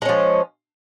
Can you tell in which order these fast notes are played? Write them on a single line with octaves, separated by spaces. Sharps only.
G#3 C#4 F3